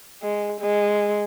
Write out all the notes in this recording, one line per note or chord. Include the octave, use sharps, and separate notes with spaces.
G#3
G#3